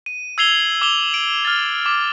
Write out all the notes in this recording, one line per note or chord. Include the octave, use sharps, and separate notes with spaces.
D#7
E6 G#6 C7 F7 G7
D6 E6 F7 G7
D7
F6 A6
D6